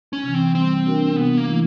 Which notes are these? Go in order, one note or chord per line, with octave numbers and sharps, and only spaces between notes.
C#4
C3 E3
C4
G3 C4
A#3 D4 F#4 A#4
C3 B3
A#3
E3 A3 C#4 E4